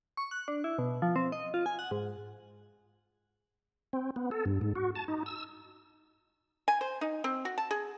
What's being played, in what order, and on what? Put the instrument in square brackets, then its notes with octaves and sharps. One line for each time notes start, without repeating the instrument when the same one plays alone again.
[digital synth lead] C#6
F#6
D4
E4
B2
F3
C4
D#5
F4
G#5
F#5
G#2
[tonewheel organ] C4
B3
A4
G2
G#2
F#4
A5
D#4
E6
[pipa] G#5
C5
D#4
C4
F#4
A5
G#4